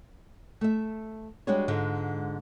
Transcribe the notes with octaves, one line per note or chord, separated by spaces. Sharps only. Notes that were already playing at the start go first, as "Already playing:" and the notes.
A3 E5
G3 G#3 D4 F#4 G#4 C#5
G#2 D3 G#3 F4